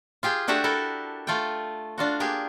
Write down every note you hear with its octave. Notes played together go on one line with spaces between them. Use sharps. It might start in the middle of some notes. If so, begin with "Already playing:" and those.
F4 G4 G#4 G5
A3 D4 F#4 G4 E5 F#5
E4 A4 A#4
A3 F4 A4 G5
D4 F4 F#4
A#3 G4 G#4